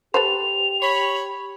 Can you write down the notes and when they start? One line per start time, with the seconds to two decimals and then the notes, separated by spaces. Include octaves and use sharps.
0.14 G4 A4 B4 C5 F7
0.82 C#5 B5